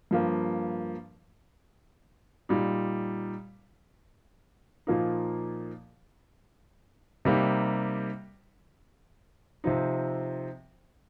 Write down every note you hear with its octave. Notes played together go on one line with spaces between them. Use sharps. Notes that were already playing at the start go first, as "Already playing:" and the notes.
G2 F3 A#3
A#2 G3 D#4
A#2 F3 A#3 D#4
C3 G3 A#3 D#4
C3 F3 C4 D#4